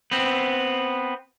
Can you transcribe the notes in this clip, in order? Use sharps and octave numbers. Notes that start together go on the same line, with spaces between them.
B3 C4